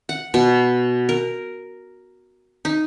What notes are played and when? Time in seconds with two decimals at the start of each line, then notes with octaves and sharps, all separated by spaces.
0.09 F#5
0.34 B2
1.09 A#4
2.65 D#4